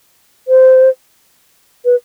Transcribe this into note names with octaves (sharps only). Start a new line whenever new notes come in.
C5
B4